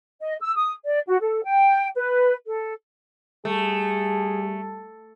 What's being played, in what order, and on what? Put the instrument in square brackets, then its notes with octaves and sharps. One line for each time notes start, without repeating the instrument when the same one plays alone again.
[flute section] D#5
E6
D#6
D5
F#4
A4
G5
B4
A4
[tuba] G3 [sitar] A3 [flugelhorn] G#4